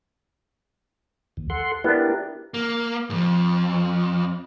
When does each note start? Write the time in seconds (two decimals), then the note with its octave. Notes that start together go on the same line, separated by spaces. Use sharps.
1.37 D#2
1.50 A4 F#5 C6
1.84 B3 D4 E4 G4 A#4
2.54 A#3
3.10 F2 G#2